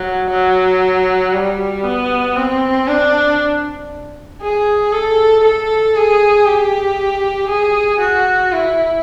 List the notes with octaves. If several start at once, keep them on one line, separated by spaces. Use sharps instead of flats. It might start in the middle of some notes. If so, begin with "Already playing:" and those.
Already playing: F#3
F#3
G3
B3
C4
D4
G#4
A4
A4
G#4
G4
G#4
F#4
E4